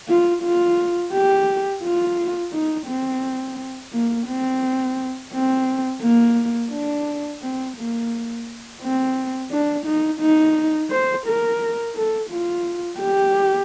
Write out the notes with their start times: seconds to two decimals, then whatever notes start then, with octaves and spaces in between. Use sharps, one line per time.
0.08 F4
0.42 F4
1.13 G4
1.83 F4
2.53 D#4
2.87 C4
3.92 A#3
4.27 C4
5.33 C4
6.02 A#3
6.71 D4
7.42 C4
7.77 A#3
8.82 C4
9.51 D4
9.85 D#4
10.21 D#4
10.91 C5
11.26 A#4
11.96 A4
12.31 F4
13.00 G4